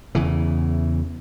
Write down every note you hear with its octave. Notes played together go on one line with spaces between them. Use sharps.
E2 C#3 E3